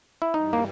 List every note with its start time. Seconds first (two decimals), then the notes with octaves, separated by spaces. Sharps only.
0.22 E4
0.34 G2 E3 G3 D#4
0.53 A#3